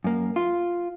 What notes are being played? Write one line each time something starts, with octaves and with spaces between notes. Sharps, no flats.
F#2 A#3
F4